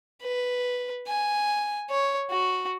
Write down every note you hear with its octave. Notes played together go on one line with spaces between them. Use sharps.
B4
G#5
C#5
F#4